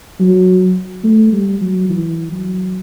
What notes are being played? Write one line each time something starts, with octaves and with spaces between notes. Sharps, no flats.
F#3
A3
G3
F#3
E3
F#3